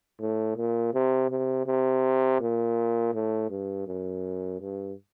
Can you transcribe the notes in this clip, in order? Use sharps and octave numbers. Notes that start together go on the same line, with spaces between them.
A2
A#2
C3
C3
C3
A#2
A2
G2
F#2
G2